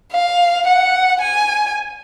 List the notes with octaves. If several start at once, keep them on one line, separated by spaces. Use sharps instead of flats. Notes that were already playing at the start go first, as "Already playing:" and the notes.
F5
F#5
G#5